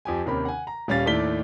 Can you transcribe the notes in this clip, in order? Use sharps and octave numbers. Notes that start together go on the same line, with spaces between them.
F2 G4 G#5
D#2 C3 D#3 C#4 B5
F#5 G#5
A#5
D#1 G3 C#4 F5 A6
D#2 A2 A3 D5 B6 G7